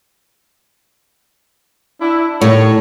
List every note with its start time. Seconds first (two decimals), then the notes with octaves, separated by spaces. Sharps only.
2.01 D4 E4
2.41 A2 D#3 G3 C#5